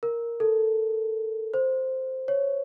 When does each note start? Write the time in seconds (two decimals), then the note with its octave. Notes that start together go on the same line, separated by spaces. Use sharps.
0.03 A#4
0.40 A4
1.54 C5
2.28 C#5